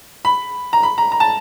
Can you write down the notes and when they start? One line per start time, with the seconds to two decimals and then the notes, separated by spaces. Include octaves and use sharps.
0.25 B5
0.73 A#5
0.83 B5
0.98 A#5
1.12 A#5
1.20 A5